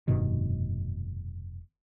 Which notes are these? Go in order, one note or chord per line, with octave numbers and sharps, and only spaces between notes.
F1 G2 B2 D#3